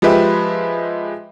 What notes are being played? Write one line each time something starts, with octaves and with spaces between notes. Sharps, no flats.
F3 G#3 G4 B4 E5